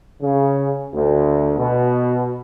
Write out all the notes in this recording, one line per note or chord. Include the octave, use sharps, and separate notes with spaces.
C#3
D2
B2